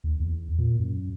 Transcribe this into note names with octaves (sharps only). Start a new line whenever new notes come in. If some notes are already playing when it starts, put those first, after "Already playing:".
D#2
E2
A#2
F#2